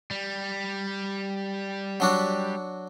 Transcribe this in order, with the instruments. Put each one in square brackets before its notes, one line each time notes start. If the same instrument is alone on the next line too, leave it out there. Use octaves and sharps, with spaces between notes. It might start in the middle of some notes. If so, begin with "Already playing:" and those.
[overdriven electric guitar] G3
[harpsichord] F#3 D4 F#4